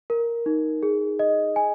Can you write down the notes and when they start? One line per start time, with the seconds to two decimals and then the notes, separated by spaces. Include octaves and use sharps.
0.10 A#4
0.46 D#4
0.83 G#4
1.19 D#5
1.56 G#5